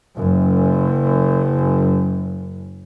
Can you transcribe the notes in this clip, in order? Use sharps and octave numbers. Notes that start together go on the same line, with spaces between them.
F#1 F#2